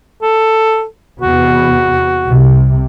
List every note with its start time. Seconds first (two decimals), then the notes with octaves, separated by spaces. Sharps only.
0.22 A4
1.22 E2 C3 B3 F#4
2.28 C2 C3